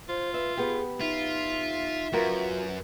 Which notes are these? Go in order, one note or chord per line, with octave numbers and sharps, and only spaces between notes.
F4 C5
B4 E5
B3 G4 G#4
D#4 F4 E5
F#2 F4 F#4 A#4 B4